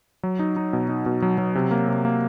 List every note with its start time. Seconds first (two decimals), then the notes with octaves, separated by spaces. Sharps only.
0.23 F#3
0.39 D#4
0.57 D#4
0.73 B2
0.89 D#4
1.06 B2
1.22 F#3
1.38 F#3
1.55 C3
1.71 A#3
1.88 C3
2.05 A#3